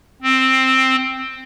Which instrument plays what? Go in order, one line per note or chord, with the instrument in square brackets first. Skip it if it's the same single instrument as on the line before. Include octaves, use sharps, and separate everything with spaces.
[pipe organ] C4